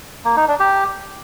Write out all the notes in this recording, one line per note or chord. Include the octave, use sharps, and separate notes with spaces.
A#3
D#4
D4
G4